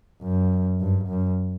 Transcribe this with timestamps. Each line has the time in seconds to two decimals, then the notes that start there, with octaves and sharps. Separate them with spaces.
0.22 F#2
0.81 G2
1.09 F#2